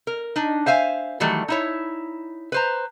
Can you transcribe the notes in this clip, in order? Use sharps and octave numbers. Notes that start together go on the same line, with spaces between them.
A#4
D4 D#4
C5 E5 F5 G#5
D#3 E3 F#3 G3 A3
D#4 E4 C#5
B4 C5 A#5